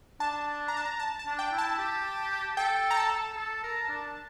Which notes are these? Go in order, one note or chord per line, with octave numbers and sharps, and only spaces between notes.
D4 A5
A#5
A5
A#5
A5
A5
D4
G5
E4
A5
G4
A4 G5
A#5
A5
A4
A#4
D4